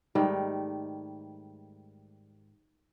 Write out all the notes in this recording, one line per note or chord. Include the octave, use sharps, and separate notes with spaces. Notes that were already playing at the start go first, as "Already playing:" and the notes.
G#2 D#3 G3 A3